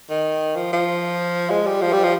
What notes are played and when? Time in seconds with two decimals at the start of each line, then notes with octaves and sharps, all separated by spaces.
0.10 D#3
0.56 F3
0.73 F3
1.50 G#3
1.66 G3
1.82 F3
1.93 G3
2.03 F3